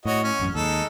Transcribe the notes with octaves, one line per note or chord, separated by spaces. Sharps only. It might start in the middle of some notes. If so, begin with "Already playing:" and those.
A2 F#4 C#5 D#5
C#4
A1 F#2
D#2 G#3 D#4 A4